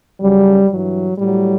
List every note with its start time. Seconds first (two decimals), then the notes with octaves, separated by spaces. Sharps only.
0.20 F#2 C#3 F#3 G3
0.69 G2 E3 F#3
1.18 A2 F#3 G3